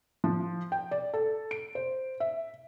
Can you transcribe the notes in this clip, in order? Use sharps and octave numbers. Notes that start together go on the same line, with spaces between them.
F3
G5
D5
A4
D7
C5
E5